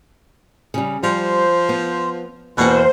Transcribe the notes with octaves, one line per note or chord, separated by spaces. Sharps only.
C#3 G3
F3 G3 C5
B3
E2 B2 E3 A#3 C5 F#5